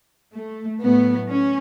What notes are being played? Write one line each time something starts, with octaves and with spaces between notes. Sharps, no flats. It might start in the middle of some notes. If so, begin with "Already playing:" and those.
A3
A2 F#3 A3 B3
C#4